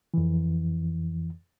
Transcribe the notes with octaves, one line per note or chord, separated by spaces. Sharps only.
F2 E3